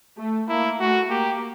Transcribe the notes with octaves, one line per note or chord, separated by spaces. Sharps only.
A3
A#3 E4
A3 F#4
A#3 G4